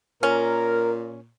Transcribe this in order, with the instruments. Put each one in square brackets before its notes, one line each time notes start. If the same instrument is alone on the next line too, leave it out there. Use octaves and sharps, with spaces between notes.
[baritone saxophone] A#2 [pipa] C#4 [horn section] A#4